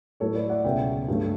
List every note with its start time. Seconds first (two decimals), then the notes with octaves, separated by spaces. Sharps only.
0.20 A2 F#3 A3 A4 C#5
0.35 B4 D5
0.50 D5 F#5
0.64 C#2 B2 F#3 E5 G5
1.08 G2 F#3 A3